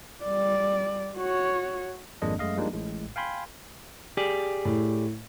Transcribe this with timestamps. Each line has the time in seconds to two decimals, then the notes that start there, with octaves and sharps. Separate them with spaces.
0.23 G3 D5
1.17 F#4 C#5
2.22 G#1 F2 G#3 A#3 D4 D#5
2.39 F#2 G#3 A3 D#5 F5
2.57 F3 G3 G#3 A#3 D4 D#4
2.73 A1 A2 G#3
3.16 F5 G5 G#5 B5 C6
4.17 G4 G#4 D5
4.65 A2